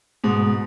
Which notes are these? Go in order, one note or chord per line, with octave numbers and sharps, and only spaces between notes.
G#2 B2